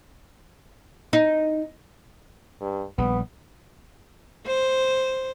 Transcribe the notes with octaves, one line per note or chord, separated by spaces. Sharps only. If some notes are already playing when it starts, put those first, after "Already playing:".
D#4
G2
A#1 C#3 G3 B3
C5